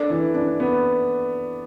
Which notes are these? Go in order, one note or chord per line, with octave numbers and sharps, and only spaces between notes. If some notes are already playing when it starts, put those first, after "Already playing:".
Already playing: D4 A4 D5
E3
D4
B3